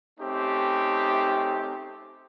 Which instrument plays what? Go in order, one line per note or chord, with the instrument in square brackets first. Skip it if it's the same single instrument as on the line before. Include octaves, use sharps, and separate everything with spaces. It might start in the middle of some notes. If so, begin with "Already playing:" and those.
[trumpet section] A3 C4 C#4 D#4 G4